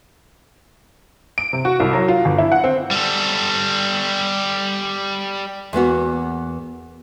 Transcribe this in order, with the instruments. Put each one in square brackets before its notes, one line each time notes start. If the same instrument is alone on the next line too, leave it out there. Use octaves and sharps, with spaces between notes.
[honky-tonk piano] D7
C3
F#4
C2
F#3
F4
G1
E4
F#5
C4
[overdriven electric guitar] G3 A4
[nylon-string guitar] E2 A#3 B3 F#4